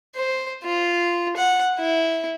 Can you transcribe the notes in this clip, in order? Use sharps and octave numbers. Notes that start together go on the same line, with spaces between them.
C5
F4
F#5
E4